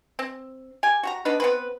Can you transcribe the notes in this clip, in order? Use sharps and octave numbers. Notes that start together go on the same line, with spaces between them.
C4
G4 G#5
F#4 G4 A#5
B3 D4 D#4 B4
B3 C4 B4